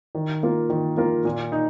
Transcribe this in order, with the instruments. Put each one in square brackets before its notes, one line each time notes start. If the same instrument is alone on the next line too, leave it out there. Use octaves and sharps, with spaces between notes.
[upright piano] D#3
A#3 F4 A#4
D#3
A#3 F4 A#4
A#2
D#4